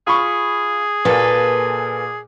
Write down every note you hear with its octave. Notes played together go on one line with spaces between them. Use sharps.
F4 G#4 B5 C#6
A#2 A#3 A4 B4